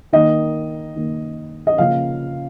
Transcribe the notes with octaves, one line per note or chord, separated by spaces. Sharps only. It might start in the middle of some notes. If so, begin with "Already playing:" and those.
D#3 A#3 D#5
D#3 A#3
D#5
C#3 F3 A#3 F5